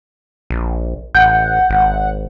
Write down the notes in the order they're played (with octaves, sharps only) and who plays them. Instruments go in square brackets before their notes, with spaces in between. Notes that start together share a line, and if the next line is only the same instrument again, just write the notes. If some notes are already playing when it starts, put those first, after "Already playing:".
[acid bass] A#1
[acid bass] A1 [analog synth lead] F#5 [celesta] G6
[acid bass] G#1